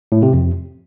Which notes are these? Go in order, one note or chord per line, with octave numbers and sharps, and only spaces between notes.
A2
C3
F2